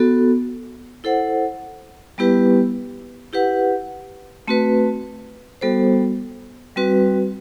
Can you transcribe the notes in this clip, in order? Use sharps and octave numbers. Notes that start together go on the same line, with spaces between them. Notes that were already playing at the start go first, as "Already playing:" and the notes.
Already playing: B3 F#4 A4
E4 A4 C5 F#5
G3 B3 E4 G4 B4
E4 G4 B4 F#5
A3 C4 F#4 B4
G3 B3 F#4 A4 C5
G3 C4 F#4 B4